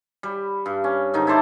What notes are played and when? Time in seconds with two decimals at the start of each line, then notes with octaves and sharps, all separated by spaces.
0.23 G3
0.66 G2
0.84 C#4
1.14 G#2 D#3 D#4
1.27 E4 A4 C5 D5